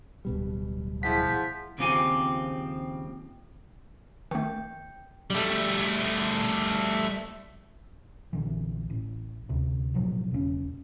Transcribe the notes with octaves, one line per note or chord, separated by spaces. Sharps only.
D1 B2 G3
F3 E4 G#4 F#5 B6
D#2 C#3 F3 C4 G4 G#5
D#3 A3 G5
G3 A3
A#1 D3 E3
A1
D2 C3
A1 B2 F3 F#3
E1 C#3 C4 C#4